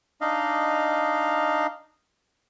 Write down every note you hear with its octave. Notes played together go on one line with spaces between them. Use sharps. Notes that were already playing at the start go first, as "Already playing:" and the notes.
D4 D#4 D#5 F5